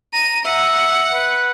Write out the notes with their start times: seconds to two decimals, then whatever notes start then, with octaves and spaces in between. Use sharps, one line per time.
0.13 A#5 D#7
0.45 E5 F#5
1.12 B4